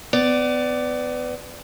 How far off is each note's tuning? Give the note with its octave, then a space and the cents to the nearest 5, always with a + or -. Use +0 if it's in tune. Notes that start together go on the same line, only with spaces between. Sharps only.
B3 +30 D5 +0